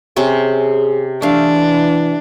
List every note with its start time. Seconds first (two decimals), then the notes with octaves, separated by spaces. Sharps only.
0.16 C3 C#4 G#4 G5
1.22 E3 A3 D4 F5